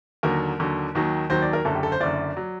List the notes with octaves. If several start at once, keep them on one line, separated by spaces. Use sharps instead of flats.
D#2 D3 F#3 A#4
D#2 D3 F#3
D#2 D#3 F#3
D#2 D#3 F#3 C5
D5
A#4
F#1 F#2 D3 A4
G4
A4
C5
F#1 F#2 D3 D5
F#3